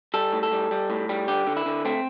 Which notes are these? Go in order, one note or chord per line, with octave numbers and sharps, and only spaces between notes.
G3 A4
A2
A4
G3
G3
A2
G3
D3 G4
D3
E4
D3
A3 C4